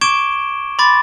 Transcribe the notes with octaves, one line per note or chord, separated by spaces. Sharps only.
C#6 D6 G#6 D7 E7 G7
B5 C6 D6 A6